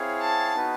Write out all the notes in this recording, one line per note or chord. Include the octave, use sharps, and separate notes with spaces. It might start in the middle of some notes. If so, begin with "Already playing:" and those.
Already playing: C4 E4 G#4 C#5 F5
A5
B3 D#4 F#4 B4